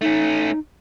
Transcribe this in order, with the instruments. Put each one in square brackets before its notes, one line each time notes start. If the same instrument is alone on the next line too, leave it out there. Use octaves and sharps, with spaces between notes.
[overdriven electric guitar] A3 C#4 [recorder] D#4